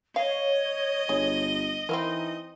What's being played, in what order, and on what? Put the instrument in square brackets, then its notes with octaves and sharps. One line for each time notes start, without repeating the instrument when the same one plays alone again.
[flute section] C#5 [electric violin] D#5 [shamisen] F5
[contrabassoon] G1 [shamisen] G#4
[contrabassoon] E3 [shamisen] C4 E4 A#4 [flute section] D#4